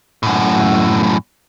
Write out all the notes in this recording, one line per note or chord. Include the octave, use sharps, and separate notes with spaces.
F#2 A2